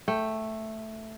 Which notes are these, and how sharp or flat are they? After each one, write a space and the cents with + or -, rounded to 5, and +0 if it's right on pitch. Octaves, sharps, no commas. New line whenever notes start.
A3 +0 G5 +0